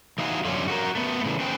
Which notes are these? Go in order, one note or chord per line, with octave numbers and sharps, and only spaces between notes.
E3 D#4 F#4 F5 F#5 G#5
F#2 D3 C#4 F4
F#4 G4 A#4
A3 B3
A2 C#3 E3
C#4 B4 C5 G5